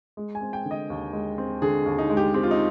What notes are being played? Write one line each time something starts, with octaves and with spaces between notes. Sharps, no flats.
G#3
G#5
C4
G5
D3
D#5
D#2
G#3
C4
D3 G#4
D#2
D#4
G#3
G4
C4 G4
F4
D#4